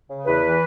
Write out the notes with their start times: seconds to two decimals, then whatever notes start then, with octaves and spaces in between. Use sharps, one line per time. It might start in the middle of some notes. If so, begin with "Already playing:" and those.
0.10 C#3
0.26 E2 B4
0.43 E3